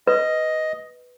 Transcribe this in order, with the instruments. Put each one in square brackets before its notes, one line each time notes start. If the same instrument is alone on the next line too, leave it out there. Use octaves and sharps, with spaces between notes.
[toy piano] B4 [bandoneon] D#5